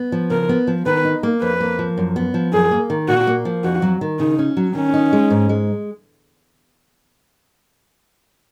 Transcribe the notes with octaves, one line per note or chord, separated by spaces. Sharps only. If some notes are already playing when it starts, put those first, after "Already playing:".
Already playing: B3
F3
C#3 A#4
B3
F3
D#3 B4
D#4
A#3
F2 B4
A#3
F3
F#2
B3
F3
F#2 G#4
A#3
D#3
A#2 F#4
A#3
F3
F2 F#4
F#3
D#3
C#3 D#4
C#4
F#3
D#3 C#4
D#4
G#3
G#2
G#3